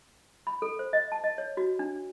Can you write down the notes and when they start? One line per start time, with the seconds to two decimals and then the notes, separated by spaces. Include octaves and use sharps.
0.47 B5
0.62 A4
0.79 C5
0.93 D#5
1.12 A5
1.24 D#5
1.38 C#5
1.57 F#4
1.79 D4